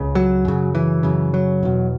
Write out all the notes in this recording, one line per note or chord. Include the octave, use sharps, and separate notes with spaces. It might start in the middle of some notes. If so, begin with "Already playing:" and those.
Already playing: C#2 C#3
F#3
F#2 C#3
E3
F#2 C#3
F#3
E2 B2